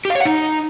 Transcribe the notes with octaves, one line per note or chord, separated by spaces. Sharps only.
G4
F5
C#5
F#5
D#4